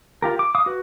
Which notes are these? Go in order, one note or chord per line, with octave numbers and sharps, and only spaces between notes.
F4 G4 A#4
D6
F5 D6 D#6
F#4 B4